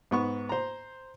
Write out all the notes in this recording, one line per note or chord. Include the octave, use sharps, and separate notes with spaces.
G#2 B3 C#6
C5 A#5